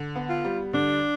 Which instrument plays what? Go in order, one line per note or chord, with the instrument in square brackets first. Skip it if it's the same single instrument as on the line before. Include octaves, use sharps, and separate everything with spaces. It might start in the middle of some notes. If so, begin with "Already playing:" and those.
Already playing: [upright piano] D3
B3
[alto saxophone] F4
[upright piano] G3
[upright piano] D3 [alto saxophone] D4